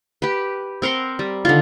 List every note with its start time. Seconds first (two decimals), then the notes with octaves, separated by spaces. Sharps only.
0.22 G4 B4
0.82 C4 A#4 F#5 C6
1.19 G3
1.45 D3 D#3 F4